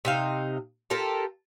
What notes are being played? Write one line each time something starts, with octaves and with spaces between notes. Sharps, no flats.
C3 D#4 F5
F4 G4 A4 A#4